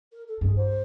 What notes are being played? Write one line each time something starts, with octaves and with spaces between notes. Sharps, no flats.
A#4
A4
G2 G#4
C5